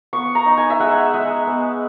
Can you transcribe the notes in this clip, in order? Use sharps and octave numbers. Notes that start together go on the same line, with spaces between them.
B3 C#6
A#5
D#4
G#5
E5
G#3 F#5
G#3
B3